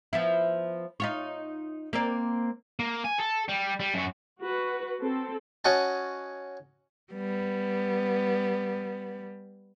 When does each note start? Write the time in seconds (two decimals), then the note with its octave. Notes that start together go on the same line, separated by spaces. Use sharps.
0.13 F3 B3 E4
1.00 D#4 F4 C#5
1.93 A#3 C4 D5
2.79 A#3
3.05 G#5
3.19 A4
3.49 G3
3.80 G3
3.94 F#2 F#4
4.41 F#4 B4
5.02 C4 A4
5.65 C#4 F#4 D#5 A5
7.15 G3 B3